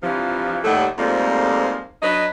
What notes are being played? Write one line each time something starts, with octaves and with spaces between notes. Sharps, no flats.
G2 C3 E3 F3
D#2 A2 G3 A3 A4 F#5
F2 G#2 F3 G3 A3 A#3
F#3 D4 B4 D#5